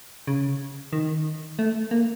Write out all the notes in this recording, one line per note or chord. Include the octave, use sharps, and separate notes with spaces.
C#3
D#3
A3
A#3